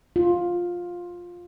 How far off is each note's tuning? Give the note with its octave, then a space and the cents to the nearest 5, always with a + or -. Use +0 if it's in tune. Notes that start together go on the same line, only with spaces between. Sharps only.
F4 +10